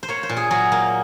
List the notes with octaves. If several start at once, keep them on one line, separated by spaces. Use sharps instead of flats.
C5
A#3 C#5
C5
A#2
G#4
F#3 G#4
A#3